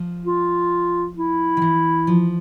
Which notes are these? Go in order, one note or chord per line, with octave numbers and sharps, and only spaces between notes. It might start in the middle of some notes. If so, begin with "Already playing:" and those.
Already playing: F3
F4
E4
D#3
E3
F3